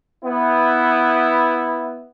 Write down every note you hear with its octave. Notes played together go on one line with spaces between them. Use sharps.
B3 E4